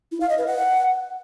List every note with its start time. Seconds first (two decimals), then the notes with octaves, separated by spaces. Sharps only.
0.12 E4
0.21 F5
0.29 D#5
0.38 B4
0.47 F#5